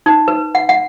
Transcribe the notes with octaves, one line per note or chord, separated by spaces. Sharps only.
D#4
B4
F#5
F#5